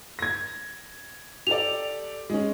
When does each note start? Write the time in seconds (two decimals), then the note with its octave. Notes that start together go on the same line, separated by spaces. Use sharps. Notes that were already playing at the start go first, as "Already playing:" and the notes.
0.19 G#6 A#6
1.47 G4 A4 D5 F7
2.30 G#3 C#4